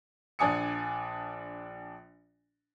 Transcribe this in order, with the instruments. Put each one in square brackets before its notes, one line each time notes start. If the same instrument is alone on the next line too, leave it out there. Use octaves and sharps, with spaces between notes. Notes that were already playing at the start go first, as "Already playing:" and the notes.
[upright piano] A#1 D4 G#5 D#6 C#7